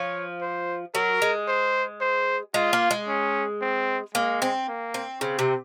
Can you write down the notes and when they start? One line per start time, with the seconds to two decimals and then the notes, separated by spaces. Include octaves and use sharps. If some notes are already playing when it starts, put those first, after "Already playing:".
Already playing: F3 C#5
0.42 C5
0.95 F#3 A#4
1.22 G#3
1.48 C5
2.01 C5
2.54 G#3 F4
2.73 A#3
2.91 G#3
3.08 C#4
3.61 C4
4.15 G#3 A#3
4.42 C4
4.68 A#3
4.94 C4
5.21 C#3 C4
5.39 C3